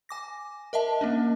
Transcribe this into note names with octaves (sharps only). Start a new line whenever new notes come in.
G#5 D6 A#6
A#4 D#5 E5 A5
A#3 C#4 D4